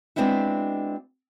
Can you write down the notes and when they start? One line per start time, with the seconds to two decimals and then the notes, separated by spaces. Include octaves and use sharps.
0.16 G#3 B3 C4 D4 E4 F#4